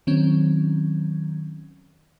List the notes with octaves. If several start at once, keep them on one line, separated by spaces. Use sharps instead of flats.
D#3 F#3 C4 C#4